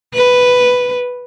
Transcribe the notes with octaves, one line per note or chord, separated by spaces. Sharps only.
B4